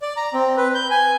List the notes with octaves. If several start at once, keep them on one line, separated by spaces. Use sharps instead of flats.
D5
A#5
C4
B4
G6
G#5